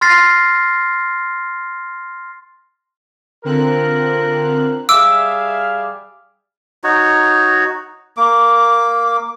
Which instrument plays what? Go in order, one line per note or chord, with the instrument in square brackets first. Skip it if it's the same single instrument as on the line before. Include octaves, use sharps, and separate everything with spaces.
[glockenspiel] C6 F6 A6 A#6 C7
[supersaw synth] D3 C4 F#6 [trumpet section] F4 A#4
[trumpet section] G3 G#4 F5 [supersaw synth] E5 [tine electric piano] D6 [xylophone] E6
[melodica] D#4 F#4 C#5
A#3 D6